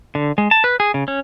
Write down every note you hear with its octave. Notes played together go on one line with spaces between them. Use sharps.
D3
G#3
A5
B4
G#4
C#3
C#4